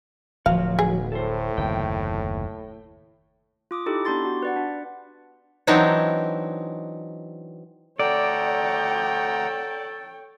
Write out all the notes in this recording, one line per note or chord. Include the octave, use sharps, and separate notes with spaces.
D1 F3 F#3 F#4 F5
B1 G#4
A2 A4 C5
F#1 D#2 C3 G5
F4 D6 D#6
D#4 E4 G4 A4
B3 D4 G4 C6 A6
D4 F#4
B4 D5 F#5
D4
E3 F#3 C4 D4 D#4 C#5
D2 A4 C#5 D5 F#5 G5 A#5